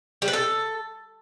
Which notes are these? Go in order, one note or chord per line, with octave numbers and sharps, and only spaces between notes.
G3
B4
A4